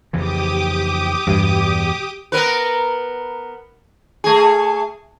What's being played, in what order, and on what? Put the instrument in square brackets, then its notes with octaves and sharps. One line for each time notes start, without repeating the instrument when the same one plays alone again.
[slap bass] F2 C#3 E3 [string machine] G4 D6 D#6
[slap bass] E2 B2 E3 [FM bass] G2
[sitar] B3 A#4 B4
A3 G#4